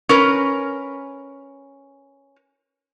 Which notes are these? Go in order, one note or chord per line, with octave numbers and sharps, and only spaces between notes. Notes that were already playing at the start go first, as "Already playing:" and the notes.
C#4 A#4 B4